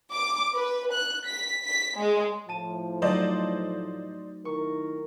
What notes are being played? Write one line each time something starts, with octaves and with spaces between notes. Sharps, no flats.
D6
B4
F#6
B6
B6
G#3
A2 F3 A5 D#7
F#3 A3 D#4 C5 D5 D#5
D#3 E4 A#4 C#6